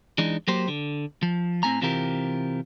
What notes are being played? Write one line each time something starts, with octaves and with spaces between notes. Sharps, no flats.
E3 G#3 D4 D#4
F#3 A#3 G4 C5
D3
F3
A2 C4 C#4 G#5 A#5
C3 E3 C4 F4 G4 A#4